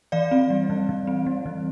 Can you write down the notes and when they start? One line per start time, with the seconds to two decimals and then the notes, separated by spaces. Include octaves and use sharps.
0.12 E3 D5 F5
0.31 C4
0.50 G3
0.70 E3
0.89 E3
1.07 C4
1.27 G3
1.46 E3